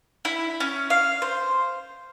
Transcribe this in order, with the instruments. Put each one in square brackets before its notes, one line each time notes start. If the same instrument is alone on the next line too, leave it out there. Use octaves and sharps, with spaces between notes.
[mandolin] E4
C#4
F5
C5